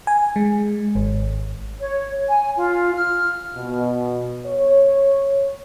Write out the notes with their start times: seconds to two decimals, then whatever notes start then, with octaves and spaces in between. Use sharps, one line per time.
0.07 G#5
0.36 G#3
0.95 G#1
1.80 C#5
2.29 G#5
2.57 F4
2.95 F6
3.55 B2
4.45 C#5